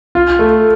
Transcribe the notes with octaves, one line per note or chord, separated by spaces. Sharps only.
F4
A3